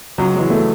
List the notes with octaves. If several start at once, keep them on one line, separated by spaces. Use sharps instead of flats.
C#2 F#3
E3 G#3
A3